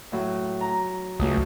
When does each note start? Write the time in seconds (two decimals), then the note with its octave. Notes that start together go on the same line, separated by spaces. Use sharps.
0.12 A2 F#3
0.61 A#5
1.20 C#2 F#3 A3 D#6